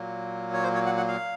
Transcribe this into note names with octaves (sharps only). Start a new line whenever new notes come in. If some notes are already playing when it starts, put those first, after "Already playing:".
Already playing: A#2 F#3 A#3
C#5
C5
C#5
F#5
F#5
F5